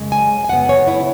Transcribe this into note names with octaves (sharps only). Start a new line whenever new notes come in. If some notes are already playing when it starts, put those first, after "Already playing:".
Already playing: F#2 C#3 G#3
G#5
G#5
F#2 C#3 F#3 B3 F#5
C#5
E4